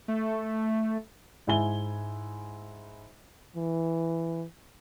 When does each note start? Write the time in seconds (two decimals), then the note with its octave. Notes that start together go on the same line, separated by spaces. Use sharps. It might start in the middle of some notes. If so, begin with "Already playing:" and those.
0.08 A3
1.47 G#2 E4 G#5 G7
3.56 E3